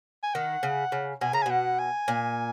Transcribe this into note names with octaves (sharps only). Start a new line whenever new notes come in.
G#5
D#3 F#5
C#3
C#3
B2 G#5
C#3 A#5
G#5
B2 F#5
G#5
A#2